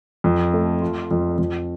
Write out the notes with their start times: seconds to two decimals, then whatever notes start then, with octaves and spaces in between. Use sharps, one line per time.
0.24 F2
0.53 A3
0.81 F4
1.11 F2
1.39 F2